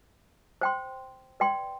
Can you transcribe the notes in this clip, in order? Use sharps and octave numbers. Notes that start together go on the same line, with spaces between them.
C5 G5 C6
B4 D5 G5 C6